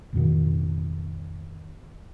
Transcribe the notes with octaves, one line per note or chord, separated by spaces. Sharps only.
A1 F2 B2 D#3